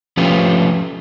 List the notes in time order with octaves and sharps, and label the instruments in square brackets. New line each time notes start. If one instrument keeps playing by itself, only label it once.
[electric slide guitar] F3 A3 C#4 F4 G4 B4